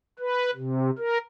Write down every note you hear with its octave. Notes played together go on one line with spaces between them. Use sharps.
B4
C3
A#4